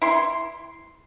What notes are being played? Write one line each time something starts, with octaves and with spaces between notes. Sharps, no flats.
E4 C6